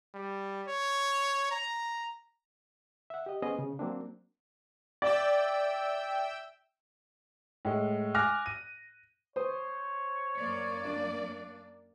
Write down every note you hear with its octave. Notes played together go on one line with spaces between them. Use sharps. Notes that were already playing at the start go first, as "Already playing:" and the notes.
G3
C#5
A#5
E5 F#5
G4 D#5
B3 C#4 G#4 C5 D#5
C#3
F#3 A#3 C4 D4
D5 E5 G5 E6
A2 G#3
G#5 D6 F6 F#6 A#6
D#7
C5 C#5 D#6
F#2 A#3 D5
D4